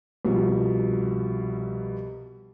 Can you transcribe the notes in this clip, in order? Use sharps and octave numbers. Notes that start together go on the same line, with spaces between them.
C2 B2 F3